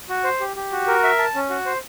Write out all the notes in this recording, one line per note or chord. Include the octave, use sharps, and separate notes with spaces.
F#4
C5
G4
G4
F#4
A#4
E5
A5
C#4
F#4
C5